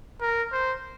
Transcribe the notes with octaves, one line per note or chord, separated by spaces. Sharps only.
A#4
C5